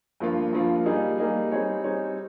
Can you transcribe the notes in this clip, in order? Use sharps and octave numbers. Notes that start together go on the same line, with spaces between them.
G2 F3 A#3 F4
G2 F3 A#3 F4
G3 A#3 D#4 G#4
G3 A#3 D#4 G#4
G3 C4 D#4 G#4 C#5
G3 C4 D#4 G#4 C#5